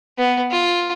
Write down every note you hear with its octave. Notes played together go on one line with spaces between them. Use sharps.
B3
F4